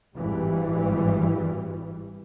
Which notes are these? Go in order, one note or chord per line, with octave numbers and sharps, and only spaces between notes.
G#1 G2 E3 G3